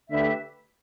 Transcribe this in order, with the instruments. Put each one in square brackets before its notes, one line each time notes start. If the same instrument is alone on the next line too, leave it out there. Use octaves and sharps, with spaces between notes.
[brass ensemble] D3 A3 D4 G4 B4 [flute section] E5